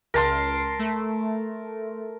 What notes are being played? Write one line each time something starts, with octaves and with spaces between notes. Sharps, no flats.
C#2 A#4 A5 C6 C7
A3